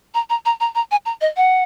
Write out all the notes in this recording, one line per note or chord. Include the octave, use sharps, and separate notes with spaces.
A#5
A#5
A#5
A#5
A#5
G#5
A#5
D#5
F#5